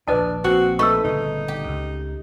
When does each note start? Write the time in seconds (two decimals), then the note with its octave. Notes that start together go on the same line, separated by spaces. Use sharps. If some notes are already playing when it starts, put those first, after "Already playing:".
0.08 A#1 D#2 D4 B4 D#5 A5
0.44 A#1 C4 F#4
0.79 A3 D#4 B4 C#6 E6
1.04 G1 A#2 C#3 D#4
1.48 G4
1.68 C#2